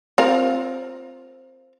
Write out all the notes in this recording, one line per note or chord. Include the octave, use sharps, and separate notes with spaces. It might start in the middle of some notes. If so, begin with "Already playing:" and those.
C4 F4 A#4